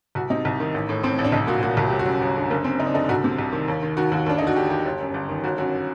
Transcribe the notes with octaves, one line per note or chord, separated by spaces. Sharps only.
C2 F#4
C3 D#4
C2
D#3
A1
A2
A2 C4
A1
D4
C2 D#4
A#2 F#4
A#2 F#4
C2 F#4
G1 G4
F#4
F#2
G1
D3
F#1 A#3
F#2 C4
F#1 D#4
D4
D3 D#4
C2 F#4
C3
C2
D#3
D#2
D#3
D#3 F#4
D#2 F#4
D#2 D4
D3 D#4
F#4
D3 G4
D#2 G4
G1
F#2
G1
D#3
G1 F#4
F#2 F#4